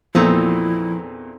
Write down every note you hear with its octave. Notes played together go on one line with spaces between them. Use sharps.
E2 A#2 F3 C4 D#4 E4 A4